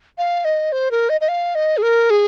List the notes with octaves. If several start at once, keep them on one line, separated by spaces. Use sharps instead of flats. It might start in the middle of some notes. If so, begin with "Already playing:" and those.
F5
D#5
C5
A#4
D#5
D#5
F5
D#5
G#4
A#4
G#4